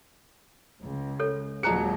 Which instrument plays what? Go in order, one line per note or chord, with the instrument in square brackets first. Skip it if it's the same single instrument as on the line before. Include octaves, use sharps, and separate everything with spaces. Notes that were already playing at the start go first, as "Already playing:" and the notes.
[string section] C#2
[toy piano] A4 C#5
[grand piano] D#1 C#7 [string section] F#3 G#3 [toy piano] G#4 C5 A#5